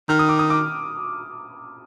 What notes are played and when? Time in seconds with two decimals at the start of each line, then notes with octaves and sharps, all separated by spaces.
0.09 D#3 F6
0.19 D#6
0.29 D6
0.39 D#6
0.50 D6